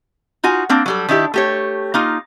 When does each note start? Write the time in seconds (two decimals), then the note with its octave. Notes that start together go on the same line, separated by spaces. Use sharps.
0.43 D#4 F4 F#4 G#5
0.69 A#3 C4 D4
0.86 F#3 G3 A4
1.09 D#3 D4 E4 G4
1.34 A3 G4 C#5
1.94 A#3 D#4 F4